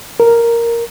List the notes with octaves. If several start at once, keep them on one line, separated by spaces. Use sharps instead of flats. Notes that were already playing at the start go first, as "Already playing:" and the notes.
A#4